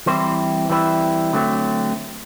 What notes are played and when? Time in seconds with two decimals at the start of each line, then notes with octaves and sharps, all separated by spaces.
0.06 E3 G3 C4 E4 C5
0.70 E3 G3 C4 E4
1.33 D3 F#3 A3 C4